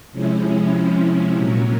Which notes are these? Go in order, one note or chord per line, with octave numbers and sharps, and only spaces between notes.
C3 F3 G#3 C#4 E4
A#2 F#3 A#3 C#4